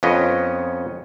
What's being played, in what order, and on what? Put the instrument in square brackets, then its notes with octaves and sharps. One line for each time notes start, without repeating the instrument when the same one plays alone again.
[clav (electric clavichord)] F2 B3 C#4 D#5